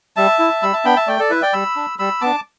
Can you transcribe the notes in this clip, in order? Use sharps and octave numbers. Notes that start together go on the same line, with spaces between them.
G3 E5 A5
E4
G3 B5 E6
E5 A5
B3 D4 G5 B5
E5 A5
A3 D5 G5
A4 D5
E4 B4 E5
D5 G5
G3 B5 E6
D4
G3 B5 E6
B3 D4 A5 D6